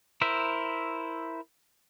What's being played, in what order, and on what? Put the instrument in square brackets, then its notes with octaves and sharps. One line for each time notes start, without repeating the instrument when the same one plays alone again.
[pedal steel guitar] E4 A#4 C5 E5